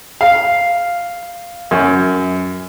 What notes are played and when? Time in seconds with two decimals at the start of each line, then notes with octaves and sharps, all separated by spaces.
0.21 F5
1.71 F#2